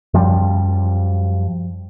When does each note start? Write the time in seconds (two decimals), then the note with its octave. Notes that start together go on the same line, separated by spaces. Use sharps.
0.14 F#2 F3 G3